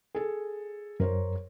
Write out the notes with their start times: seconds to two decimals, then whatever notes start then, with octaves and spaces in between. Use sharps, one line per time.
0.15 G#4 A4
1.00 F#2 A#4 C5 C#5